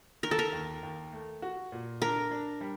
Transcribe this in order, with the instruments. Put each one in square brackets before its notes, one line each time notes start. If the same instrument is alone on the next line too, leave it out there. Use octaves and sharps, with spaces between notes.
[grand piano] D#3 [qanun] A#4
[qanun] A4
A#4
[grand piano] D#2
D#2
A3
F#4
A#2
[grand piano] D4 [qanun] A#4
[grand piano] D4
G3